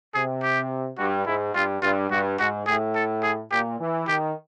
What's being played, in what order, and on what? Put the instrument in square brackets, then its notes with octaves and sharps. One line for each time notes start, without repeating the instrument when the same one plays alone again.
[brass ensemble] C3 [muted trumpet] G#4
[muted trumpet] G4
[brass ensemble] G2 [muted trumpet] F#4
[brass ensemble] G#2 [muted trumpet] E4
[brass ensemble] G2 [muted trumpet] F4
[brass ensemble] G2 [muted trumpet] F4
[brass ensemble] G2 [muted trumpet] F#4
[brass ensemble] G#2 [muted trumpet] F#4
[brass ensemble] A2 [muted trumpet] G#4
[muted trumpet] A4
G#4
[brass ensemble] A#2 [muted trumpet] G4
[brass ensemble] E3
[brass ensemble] D#3 [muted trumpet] G4